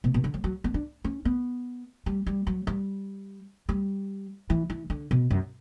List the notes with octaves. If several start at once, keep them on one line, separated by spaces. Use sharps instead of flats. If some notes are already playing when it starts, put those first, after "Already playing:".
B2
B2
D3
F#3
F#3
B3
D4
C#4
B3
G3
G3
F#3
G3
G3
E3
E3
D3
B2
F#2